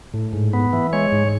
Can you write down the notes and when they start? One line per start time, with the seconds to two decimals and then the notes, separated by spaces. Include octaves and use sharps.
0.14 A2
0.33 G#2
0.53 B3
0.73 E3
0.93 G#3 C#5
1.12 G#2